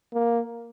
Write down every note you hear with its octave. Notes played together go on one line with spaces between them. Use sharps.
A#3